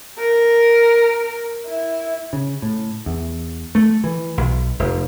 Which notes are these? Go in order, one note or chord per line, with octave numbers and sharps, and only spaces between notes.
A#4
E4
C#3
A2
E2
A3
E3
B1
F1